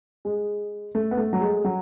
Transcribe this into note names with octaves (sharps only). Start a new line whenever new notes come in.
G#3
A3
B3
A3
F#3
G#3
F#3